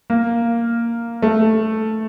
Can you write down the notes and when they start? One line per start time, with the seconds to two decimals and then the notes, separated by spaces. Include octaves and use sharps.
0.10 A#3
1.22 A3